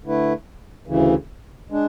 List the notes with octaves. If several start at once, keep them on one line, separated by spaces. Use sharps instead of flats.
D3 A3 E4 B4
D2 C#3 E3
G#3 D4